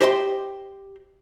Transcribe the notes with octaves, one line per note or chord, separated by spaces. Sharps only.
G4 C5 D#5 G5 A5 C6